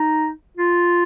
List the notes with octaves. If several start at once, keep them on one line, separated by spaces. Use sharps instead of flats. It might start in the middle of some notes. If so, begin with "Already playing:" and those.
Already playing: D#4
F4